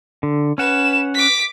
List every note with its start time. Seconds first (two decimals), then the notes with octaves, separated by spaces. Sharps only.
0.23 D3
0.58 C#4 B4 F#5 E7
1.14 D6 B6